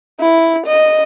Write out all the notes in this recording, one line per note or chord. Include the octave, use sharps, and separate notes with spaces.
E4
D#5